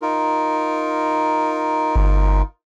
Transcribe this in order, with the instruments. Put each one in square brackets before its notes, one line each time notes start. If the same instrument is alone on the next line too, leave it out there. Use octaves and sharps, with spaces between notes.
[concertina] D#4 F4 A#4
[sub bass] G1